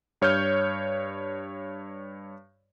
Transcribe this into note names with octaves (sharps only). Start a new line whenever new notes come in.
G2 C#5 F6 G6